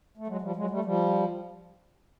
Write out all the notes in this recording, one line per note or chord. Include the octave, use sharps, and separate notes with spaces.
A3
F#3 G#3
F3 G3
F#3 G#3
G3 A3
F3 G3